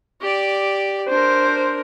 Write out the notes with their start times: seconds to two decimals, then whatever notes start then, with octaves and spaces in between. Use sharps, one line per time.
0.21 G4 D5
1.09 D4 A#4 C5